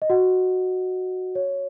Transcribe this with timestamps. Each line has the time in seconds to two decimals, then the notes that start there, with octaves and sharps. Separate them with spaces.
0.02 D#5
0.10 F#4 F#5
1.35 C#5